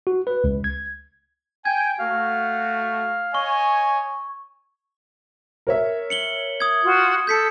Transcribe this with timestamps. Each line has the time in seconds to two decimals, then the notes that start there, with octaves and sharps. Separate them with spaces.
0.07 F#4
0.27 B4
0.44 C#2
0.64 G#6
1.65 G5 G#5 G#6
2.00 A3 F#4 F5
3.34 C#5 D#5 G#5 C#6
5.67 A#4 C#5 E5
6.10 C#7 F#7 G7
6.60 D#6 G#6
6.83 F4 F#4
7.27 A4 G6 B6 C#7